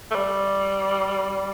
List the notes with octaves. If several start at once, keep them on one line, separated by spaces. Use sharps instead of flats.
A3
G3